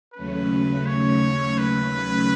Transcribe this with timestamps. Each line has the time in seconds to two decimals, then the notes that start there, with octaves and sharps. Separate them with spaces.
0.14 D#2 C#3 F#3 A3 C#4 B4
0.86 C#5
1.58 B4